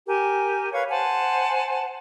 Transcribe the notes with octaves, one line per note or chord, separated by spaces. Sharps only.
G4 A#4 G#5
B4 C#5 F5 G#6
C5 F#5 G#5 A5